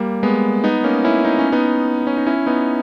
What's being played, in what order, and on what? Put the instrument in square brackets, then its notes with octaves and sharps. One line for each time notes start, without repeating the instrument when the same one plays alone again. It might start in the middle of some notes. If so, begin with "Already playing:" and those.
Already playing: [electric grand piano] G3 A#3
G#3 B3
B3 D#4
A#3 C#4
C#4 E4
D#4
C#4
B3 D#4
C#4
D#4
C#4 E4
B3 D#4